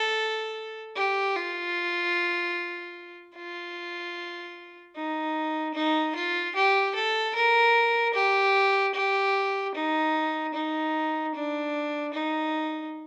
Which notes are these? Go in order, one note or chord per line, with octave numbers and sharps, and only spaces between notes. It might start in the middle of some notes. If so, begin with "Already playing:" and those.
Already playing: A4
G4
F4
F4
D#4
D#4
F4
G4
A4
A#4
G4
G4
D#4
D#4
D4
D#4